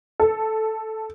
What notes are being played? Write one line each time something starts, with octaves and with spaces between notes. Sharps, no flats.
A4